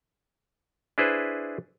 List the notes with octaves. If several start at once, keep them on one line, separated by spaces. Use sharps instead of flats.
D4 E4 G#4 B4 C5